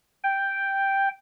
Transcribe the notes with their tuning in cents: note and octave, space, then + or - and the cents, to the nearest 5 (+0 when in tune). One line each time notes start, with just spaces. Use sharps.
G5 +0